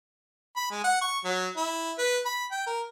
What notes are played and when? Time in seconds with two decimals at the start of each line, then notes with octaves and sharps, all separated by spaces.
0.56 B5
0.71 G#3
0.84 F#5
1.02 C#6
1.25 F#3
1.57 E4
1.98 B4
2.25 B5
2.52 G5
2.67 A#4